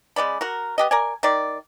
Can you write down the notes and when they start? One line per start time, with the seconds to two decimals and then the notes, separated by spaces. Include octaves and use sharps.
0.16 C#3 G#3 D5 B5
0.41 F#4 A#4
0.78 B3 G4 D#5
0.91 A#4 D5 G#5
1.23 D#3 D5